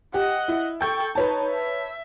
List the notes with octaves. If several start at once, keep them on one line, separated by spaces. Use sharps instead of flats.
G4 D#5 F#5
E4
A4 G5 C#6 G6
D#4 B4 C#5 A5
E5